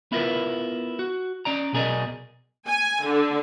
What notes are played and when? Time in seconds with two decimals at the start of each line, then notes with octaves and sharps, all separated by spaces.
0.12 B3 E4 F4 A#4 B4
0.99 F#4
1.45 C#4 D5 A#5
1.73 B1 B2 G#4 A#4 D5 D#5
2.67 G#5
3.05 D3